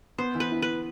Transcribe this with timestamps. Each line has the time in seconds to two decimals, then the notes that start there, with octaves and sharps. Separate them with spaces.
0.18 B3 C5
0.35 E3
0.40 B4
0.52 E4
0.62 B4